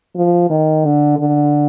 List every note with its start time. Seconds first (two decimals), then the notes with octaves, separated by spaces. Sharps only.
0.16 F3
0.50 D#3
0.85 D3
1.19 D3